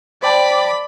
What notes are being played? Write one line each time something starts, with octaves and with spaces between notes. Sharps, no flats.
C5 D5 G5 A5 B5